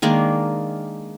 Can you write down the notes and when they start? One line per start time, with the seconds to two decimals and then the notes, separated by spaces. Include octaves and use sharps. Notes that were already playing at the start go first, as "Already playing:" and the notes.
0.02 D#3 G#3 A#3 D4